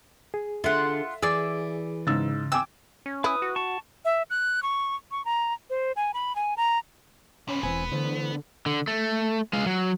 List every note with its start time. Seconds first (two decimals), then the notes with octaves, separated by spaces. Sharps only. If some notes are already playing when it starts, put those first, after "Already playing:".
0.34 G#4
0.64 D3 F4 E5 F#5
1.22 E3 G#4 D5 E6
2.07 G#2 C#3 E6 A6
2.52 G5 G#5 D6 E6
3.06 C#4
3.24 E4 B4 D#6
3.42 F#4
3.56 A5 C#6
4.05 E5
4.30 F#6
4.63 C#6
5.11 C#6
5.25 A#5
5.70 C5
5.96 G#5
6.14 B5
6.36 G#5
6.57 A#5
7.48 C3 B3 C#4
7.63 E1 E3 B3 C4 G#5
7.92 D3 E3 A3 C5
8.66 D3
8.88 A3
9.53 G#3 F5
9.66 F#3